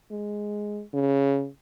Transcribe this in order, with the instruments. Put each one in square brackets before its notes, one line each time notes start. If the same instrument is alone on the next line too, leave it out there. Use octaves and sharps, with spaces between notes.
[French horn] G#3
C#3